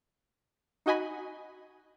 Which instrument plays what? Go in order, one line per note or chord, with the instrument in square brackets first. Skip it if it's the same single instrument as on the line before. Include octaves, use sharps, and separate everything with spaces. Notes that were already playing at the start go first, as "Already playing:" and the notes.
[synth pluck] D#4 F#4 D#5 G#5 B5